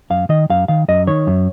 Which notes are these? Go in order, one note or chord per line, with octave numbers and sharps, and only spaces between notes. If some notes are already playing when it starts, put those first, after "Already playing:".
F#2 F5
D#3 D#5
F#2 F5
D#3 F5
F#2 D#5
D#3 C#5
F#2